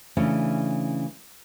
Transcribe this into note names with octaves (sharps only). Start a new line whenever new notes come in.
C#3 E3 A3 C#4 D4